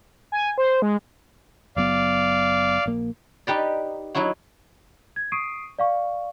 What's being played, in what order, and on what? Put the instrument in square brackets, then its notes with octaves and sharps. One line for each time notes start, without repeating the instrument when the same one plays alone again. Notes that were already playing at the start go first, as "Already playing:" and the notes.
[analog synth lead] G#5
C5
G#3
[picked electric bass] F#1 F#3 B3 [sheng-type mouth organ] D5 F5
[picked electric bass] A#1 A#3
[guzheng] D#4 G4 B4 D5
F#3 D#4 E4 F#4
[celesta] G#6
C#6 D#6 C7 D7 D#7
D5 F5 C#6